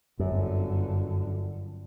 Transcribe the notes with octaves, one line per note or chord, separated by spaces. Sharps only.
G1 F#2 D3